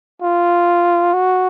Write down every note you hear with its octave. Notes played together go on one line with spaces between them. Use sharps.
F4
F#4